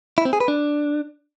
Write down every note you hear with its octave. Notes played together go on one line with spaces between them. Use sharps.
E4
C4
G#4
B4
D4